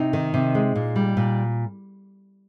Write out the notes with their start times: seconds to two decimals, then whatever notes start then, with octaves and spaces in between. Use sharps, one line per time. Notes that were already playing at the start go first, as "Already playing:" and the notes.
Already playing: C3 D#4
0.13 D#3
0.34 C3
0.55 G#3
0.76 A#2
0.96 G3
1.17 A#2